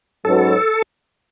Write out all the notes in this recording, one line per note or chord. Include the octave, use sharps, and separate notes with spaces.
G#2 F#3 C#4 F#4 A4 B4